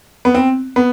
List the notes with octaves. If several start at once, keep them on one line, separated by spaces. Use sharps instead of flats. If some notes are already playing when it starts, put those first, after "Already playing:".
B3
C4
B3